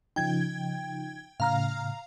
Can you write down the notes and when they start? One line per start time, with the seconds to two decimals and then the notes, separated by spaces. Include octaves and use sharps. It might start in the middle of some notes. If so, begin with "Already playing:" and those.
0.16 C#3 F3 D#4 G5 G#6
1.40 A2 C#3 F5 A#5 F6